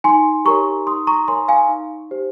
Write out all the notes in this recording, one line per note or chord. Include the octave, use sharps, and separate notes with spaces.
D#4 G#5 C6
G4 A#4 C#5 A#5 C#6
D#4 C6 D#6
A#5 C#6
A#4 C#5 G#5 C6
F5 G#5
D#4
G4 C5